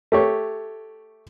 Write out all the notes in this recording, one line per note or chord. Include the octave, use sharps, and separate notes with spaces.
A3 G4 C#5